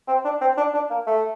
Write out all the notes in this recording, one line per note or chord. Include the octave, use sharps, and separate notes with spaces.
C4
D4
C4
D4
D4
A#3
A3